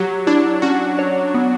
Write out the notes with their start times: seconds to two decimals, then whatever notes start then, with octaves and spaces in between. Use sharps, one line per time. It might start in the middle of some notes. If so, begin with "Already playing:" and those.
Already playing: F#3 G4
0.27 D4 E4
0.62 C#4 F#4
0.99 C#5
1.34 B3